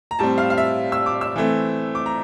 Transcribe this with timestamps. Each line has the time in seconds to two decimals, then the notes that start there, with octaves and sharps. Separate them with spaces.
0.11 A#5
0.19 A2 G3 C4 A5
0.38 F5
0.50 F5
0.58 E5
0.92 E6
1.06 D6
1.21 E6
1.36 E3 A3 C4
1.95 D6
2.06 A#5